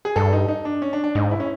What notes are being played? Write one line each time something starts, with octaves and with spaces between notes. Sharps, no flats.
G#4
G2 A4
D#4
D#4
D4
C#4
D4
D4
G#2 D#4
E4
C#4